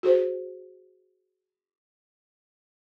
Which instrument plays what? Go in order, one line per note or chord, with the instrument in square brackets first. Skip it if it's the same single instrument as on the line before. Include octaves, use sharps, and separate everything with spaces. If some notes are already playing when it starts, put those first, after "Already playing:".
[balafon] F#4 G#4 C5